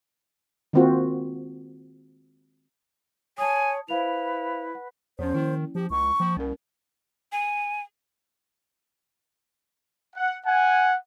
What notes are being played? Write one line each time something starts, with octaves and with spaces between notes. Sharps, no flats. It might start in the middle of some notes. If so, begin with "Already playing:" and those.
D#3 G#3 A#3 C4 F4 F#4
C#5 G#5 A5 D#6
E4 B4 C5 F5 F7
F#5
E2 F3 C#4 C5
D#3 A#3 E4
F3 G4
C#2 C#6
F3 A#3
C2 C#4 A#4
G#5
F#5
F#5 G#5